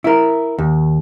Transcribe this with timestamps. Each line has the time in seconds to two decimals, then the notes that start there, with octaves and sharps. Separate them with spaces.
0.04 E4 A#4
0.58 D#2